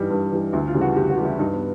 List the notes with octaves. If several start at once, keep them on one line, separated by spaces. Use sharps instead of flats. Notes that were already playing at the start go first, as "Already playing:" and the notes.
Already playing: G2 E3 G3 D#4
G2
E3 G3
D2 E4
F4
C#3 E3 G3
F#4
D2 G4
F#4
C#3 E3 G3
E4
G2 D#4
B3